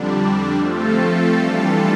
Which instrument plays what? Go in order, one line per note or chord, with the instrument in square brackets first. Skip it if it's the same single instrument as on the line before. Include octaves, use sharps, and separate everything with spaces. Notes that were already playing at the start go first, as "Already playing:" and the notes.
Already playing: [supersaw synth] F2 D3 G3 D4
F3 A3 C4 F4 A4
E3 G3 D4 F4 A4